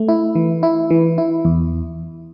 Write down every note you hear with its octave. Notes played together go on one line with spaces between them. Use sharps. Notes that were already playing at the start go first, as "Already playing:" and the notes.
Already playing: A3
E4
E3
E4
E3
E4
E2